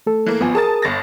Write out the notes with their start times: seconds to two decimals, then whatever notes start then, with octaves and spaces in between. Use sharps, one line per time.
0.06 A3 A4
0.26 E3 A#3
0.41 G#1 F3 B3 G#5
0.55 G#4 A#4 A5 D#6 A6
0.82 G1 A6 A#6